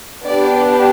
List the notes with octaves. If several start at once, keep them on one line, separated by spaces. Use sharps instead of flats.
B3 D4 G4 D5